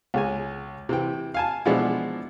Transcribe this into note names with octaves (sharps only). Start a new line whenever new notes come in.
C#2 G#3 G#5
C3 E3 G5
F5 G#5 A5
B2 E3 F3 G#3 D4 E4